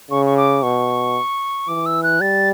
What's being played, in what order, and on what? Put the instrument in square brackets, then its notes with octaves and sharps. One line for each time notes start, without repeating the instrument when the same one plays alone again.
[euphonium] C#3 [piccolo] C#6
[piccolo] C#6
D6
[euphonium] B2 [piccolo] C#6
[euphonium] E3 [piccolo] D6
[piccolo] E6
F#6
[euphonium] G3 [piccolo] A6